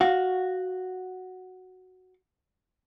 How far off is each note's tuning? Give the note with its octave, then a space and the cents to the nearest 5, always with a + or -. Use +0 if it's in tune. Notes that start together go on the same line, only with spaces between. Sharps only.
F#4 +0 F5 +15